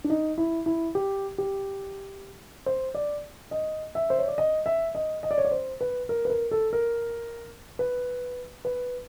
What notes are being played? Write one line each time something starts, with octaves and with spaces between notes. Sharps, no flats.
D4
D#4
E4
E4
G4
G4
C5
D5
D#5
E5
C5
C#5
D5
D#5
E5
D#5
D#5
D5
C#5
D5
C5
B4
A#4
B4
A#4
A4
A#4
B4
B4